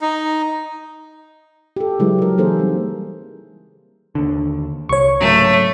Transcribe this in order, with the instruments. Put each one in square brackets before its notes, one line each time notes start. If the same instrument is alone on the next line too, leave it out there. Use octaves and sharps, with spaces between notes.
[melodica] D#4
[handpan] G4 A4
C#3 F#3 G#3 E4 B4
G4 A#4
E3 A#3 D#4 G#4 A4 C5
G3 C4
[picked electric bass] D#2 D3
[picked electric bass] C2 [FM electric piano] C#5 C#6
[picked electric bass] G#2 C#3 F#3 [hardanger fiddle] A3